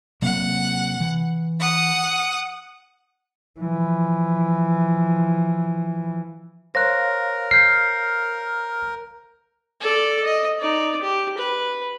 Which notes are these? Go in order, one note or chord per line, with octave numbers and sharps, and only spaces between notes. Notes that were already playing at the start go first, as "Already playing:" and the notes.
C3 F#3 A#3 F#5
E3
F#5 D#6
E3 F3
A#4 C5 C#5 F5 F#6 A#6
F6 G6 C7
A4 D5
D#5
D#4 D5
G4
B4